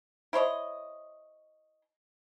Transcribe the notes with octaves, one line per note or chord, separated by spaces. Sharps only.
E4 C5 C#5 D#5